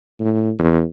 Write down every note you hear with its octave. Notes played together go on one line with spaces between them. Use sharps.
A2
E2